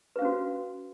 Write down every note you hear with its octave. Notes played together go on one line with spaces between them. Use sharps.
C#4 F#4 B4 F5